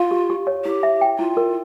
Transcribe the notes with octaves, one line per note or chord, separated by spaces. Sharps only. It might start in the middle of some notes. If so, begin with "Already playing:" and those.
Already playing: F4 F5
G4
G4
C#5
E4 G4
E5
G5
E4 F4
A#4